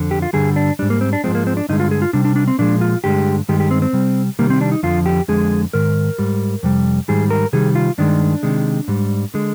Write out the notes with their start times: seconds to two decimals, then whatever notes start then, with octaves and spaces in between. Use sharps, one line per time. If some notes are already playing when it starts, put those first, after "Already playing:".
Already playing: F2 D3
0.11 G4
0.22 F4
0.33 G2 D3 G3 G#4
0.56 D4
0.79 G3 D4
0.82 G#2
0.90 A#3
1.01 C4
1.13 D4
1.24 G#2 F3 G#3 C4
1.35 A#3
1.47 C4
1.57 D4
1.69 G2 D3 G#3 D#4
1.80 F4
1.91 G#4
2.02 F4
2.13 C3 G3 D4
2.25 D4
2.36 D4
2.48 C4
2.59 A#2 F3 G#3 D4
2.81 F4
3.04 G2 D3 G#3 G4
3.49 G2 D#3 G#3 G4
3.60 G4
3.71 C4
3.82 C4
3.93 C3 G3
4.39 C3 D#3 G3 A#3
4.50 C4
4.61 D4
4.72 D#4
4.83 F2 D3 F3 F4
5.06 G4
5.28 F2 D3 G#3 G#4
5.73 G#2 D#3 A#4
6.18 G#2 G3
6.63 F2 C3 G3
7.08 G#2 D#3 G3 G#4
7.30 A#4
7.53 C3 D#3 G3 G#4
7.75 F4
7.98 G2 D#3 G#3 D4
8.43 C3 D#3 G#3
8.88 G#2 G3
9.34 D3 G#3